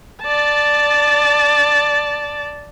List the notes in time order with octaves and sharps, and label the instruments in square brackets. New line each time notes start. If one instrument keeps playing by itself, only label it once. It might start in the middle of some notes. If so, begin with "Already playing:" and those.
[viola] D5 A5